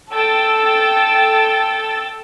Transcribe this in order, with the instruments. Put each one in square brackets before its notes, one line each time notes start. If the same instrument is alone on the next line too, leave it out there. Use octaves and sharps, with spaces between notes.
[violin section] A4 G5 E6 A6